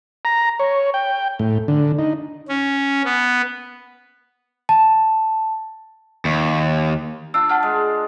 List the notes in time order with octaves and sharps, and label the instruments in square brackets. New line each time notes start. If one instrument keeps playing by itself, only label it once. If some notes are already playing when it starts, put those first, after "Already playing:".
[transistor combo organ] A#5
C#5
G5
A2
D3
D#4
[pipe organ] C#4
B3
[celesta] A5
[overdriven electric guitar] D#2
[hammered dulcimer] D4 F4 [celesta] E6
[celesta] F#5 A5 F6
[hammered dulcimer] G#3